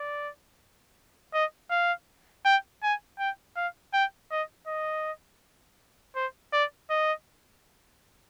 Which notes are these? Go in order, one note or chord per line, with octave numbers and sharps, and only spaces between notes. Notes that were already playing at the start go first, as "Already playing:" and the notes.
Already playing: D5
D#5
F5
G5
G#5
G5
F5
G5
D#5
D#5
C5
D5
D#5